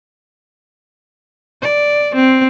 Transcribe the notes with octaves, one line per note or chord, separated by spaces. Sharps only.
D5
C4